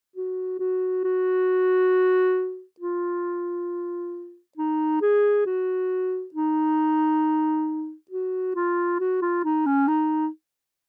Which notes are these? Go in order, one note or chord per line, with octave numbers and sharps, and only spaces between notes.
F#4
F#4
F#4
F4
D#4
G#4
F#4
D#4
F#4
F4
F#4
F4
D#4
C#4
D#4